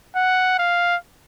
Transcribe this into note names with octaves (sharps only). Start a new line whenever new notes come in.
F#5
F5